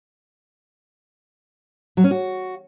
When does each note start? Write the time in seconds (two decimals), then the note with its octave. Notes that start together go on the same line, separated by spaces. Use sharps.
1.97 F#3
2.04 C#4
2.11 F#4